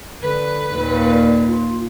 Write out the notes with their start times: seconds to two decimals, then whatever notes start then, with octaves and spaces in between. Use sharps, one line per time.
0.22 D3 B4
0.73 D#2 A#2
1.10 D5
1.48 F4